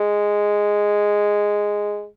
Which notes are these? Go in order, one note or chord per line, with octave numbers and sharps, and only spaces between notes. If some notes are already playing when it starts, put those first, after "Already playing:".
Already playing: G#3